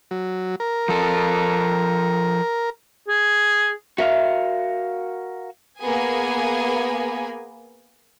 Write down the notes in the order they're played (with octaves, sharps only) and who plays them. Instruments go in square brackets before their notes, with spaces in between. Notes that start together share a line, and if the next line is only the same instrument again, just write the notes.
[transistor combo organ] F#3
A#4
[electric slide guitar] F3 A4
[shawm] G#4
[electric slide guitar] F#4 A#4 F5 [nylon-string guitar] E5
[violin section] A#3 B3 G#4 G#5